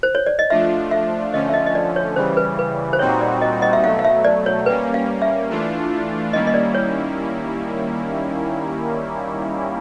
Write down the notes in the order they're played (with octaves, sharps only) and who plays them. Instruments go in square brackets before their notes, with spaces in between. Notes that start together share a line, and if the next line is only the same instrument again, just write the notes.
[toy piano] C5
C#5
D5
D#5
[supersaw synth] F3 A3 D4 F4 [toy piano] E5
[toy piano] E5
[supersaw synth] D3 F3 A3 C#4 [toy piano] D#5
[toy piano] E5
D#5
D#5
D5
C#5
[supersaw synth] C#3 E3 G3 [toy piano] C5
[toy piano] B4
B4
C5
[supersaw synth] A#2 G3 C4 D#4 F#4 [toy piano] C#5
[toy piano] D5
D#5
D#5
E5
[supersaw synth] B2 F#3 A3 [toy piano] F5
[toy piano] F5
E5
D5
C#5
[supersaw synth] G3 A#3 C#4 [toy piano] B4
[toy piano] F5
E5
[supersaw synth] E3 A3 D4 F4
[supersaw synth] D#3 G3 A#3 C#4 E4 [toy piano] D#5
[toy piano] D#5
D5
C#5